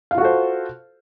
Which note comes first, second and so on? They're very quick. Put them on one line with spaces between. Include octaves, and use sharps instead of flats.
F5 F4 F#4 A4 C5